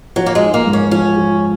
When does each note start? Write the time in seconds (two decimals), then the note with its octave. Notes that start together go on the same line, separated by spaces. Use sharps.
0.16 F3 F#3
0.26 A#3
0.35 G#3
0.42 D#4
0.54 A#3
0.66 G#2
0.73 C#4
0.91 F3 C#4
1.17 F3